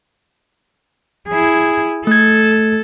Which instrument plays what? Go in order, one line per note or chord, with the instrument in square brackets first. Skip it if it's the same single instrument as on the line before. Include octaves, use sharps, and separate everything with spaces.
[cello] E4 G#4
[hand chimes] A3 G#6 [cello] A4